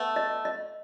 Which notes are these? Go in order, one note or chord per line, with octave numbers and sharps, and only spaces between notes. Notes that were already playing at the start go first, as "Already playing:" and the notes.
Already playing: A3 B3
D#5
D#5